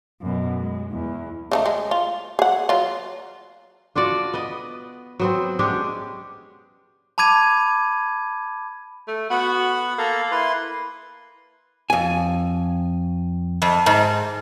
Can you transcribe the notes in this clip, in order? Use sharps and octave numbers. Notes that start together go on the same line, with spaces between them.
F#2 B2
G#3
E2
C#3 A3 D#4
G#3
F4
G#4 F#5
F#3 F4
D4 F4 F#4 D5
B3 B4 D#5
F#3 B3 C4
G#3 C#4 D4 G4
A5 B5 D6 G#6 D#7
A3
B3 F#4 F#5 B5
A#3 A4 A#5
E4 B4 C6
F2 G#5
F2
G#2